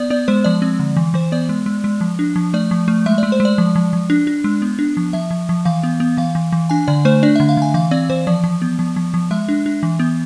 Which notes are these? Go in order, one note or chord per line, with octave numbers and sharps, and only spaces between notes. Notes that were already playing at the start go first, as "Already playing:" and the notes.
Already playing: B3 D5
B3 D5
G#3 C5
F3 D5
C4
D3
E3
E3 C5
B3 D5
G#3
G#3
G#3
F3
D4
F3
A3 D5
F3
A3
G#3 E5
D5
G#3
C5
G#3
D5
F3
F3
F3
D4
D4
G#3
B3
D4
F3
F3 E5
F3
F3
E3 F5
B3
B3
E3 F5
E3
E3
D4 G#5
D3 D5
A3 C5
D4 D5
E5
D3
F5
D3 G#5
E3 F5
C4 D5
E3 C5
F3 D5
F3
B3
F3
F3
F3
G#3 E5
D4
D4
E3
B3